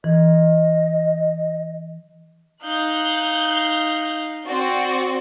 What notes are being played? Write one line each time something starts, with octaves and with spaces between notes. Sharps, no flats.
E3 D#5
D#4 F5 F#6 G6
C4 F#4 D5